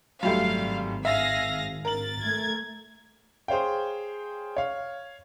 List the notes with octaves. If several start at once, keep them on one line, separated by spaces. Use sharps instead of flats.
G#1 F#2 G3 A3 F5
G#4 E5 F5 A#6
A#4 A6 F#7
A3 G#6
G#4 C5 C#5 F5 G5
C#5 F5